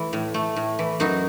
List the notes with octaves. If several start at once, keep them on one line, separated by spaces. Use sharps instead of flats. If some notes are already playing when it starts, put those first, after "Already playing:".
Already playing: E3 A3
A2
A3
A2
E3
F#2 D#4 F#4